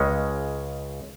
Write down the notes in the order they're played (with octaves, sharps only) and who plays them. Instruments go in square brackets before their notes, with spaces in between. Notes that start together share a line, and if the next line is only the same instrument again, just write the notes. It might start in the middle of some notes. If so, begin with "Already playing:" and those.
Already playing: [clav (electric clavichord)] C#2 C#3 G#3 C#4